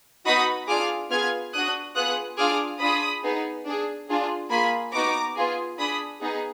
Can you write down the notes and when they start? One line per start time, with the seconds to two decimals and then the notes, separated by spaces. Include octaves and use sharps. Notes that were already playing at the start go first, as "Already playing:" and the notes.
0.26 B3 D#4 F#4 B5 D#6
0.68 D4 F4 G#4 D6 F6
1.10 B3 F4 G#4 F6 G#6
1.53 D4 F#4 D#6 F#6
1.95 B3 F4 G#4 D#6 F#6
2.38 D4 F4 G#4 D6 F6
2.80 D4 F4 G#4 B5 D#6
3.23 B3 D#4 G#4
3.66 D4 G#4
4.09 D4 F4 G#4
4.50 A#3 F4 G#4 G#5 B5
4.93 B3 D#4 F#4 A#5 D6
5.36 B3 F4 G#4
5.78 D4 G#4 B5 D#6
6.22 B3 D#4 G#4